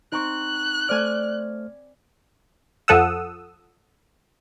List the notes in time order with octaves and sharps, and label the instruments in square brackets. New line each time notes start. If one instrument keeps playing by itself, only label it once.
[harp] C4 [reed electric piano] D#4 A#5 C#6 [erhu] F#6
[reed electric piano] A3 C5 F6 [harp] D5 G#5
[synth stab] F2 F3 A4 F#5 D#6 E6